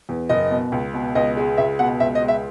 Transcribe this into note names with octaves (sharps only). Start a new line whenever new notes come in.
E2
F#1 D#5
B2
C#2
B2
C#2 D#5
G#3
C#2 E5
B2 F#5
C#2 E5
D#5
G#3
E5